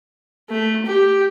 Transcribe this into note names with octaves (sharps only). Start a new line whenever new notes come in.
A3
G4